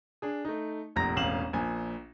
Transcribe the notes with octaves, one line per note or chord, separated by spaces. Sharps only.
D4 G#4
A3 D#4
F1 A#1 A#5 A#6
E1 A1 F5 E7 F#7
A#1 A#2 G#5